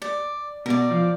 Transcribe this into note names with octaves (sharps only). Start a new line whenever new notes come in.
D5
B2 A#4 D5
F3